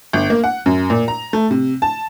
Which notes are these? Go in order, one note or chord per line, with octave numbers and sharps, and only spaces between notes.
G1
A#3
F#5
F#2
A#2
A#5
A3
C3
A5